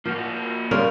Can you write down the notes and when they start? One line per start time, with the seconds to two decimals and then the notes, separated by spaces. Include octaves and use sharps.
0.05 F3 A#3 F#4
0.71 C#3 G3 C#4 F4 A#4